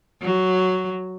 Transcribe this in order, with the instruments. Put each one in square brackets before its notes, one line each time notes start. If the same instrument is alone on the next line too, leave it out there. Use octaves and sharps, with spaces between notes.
[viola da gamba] F#3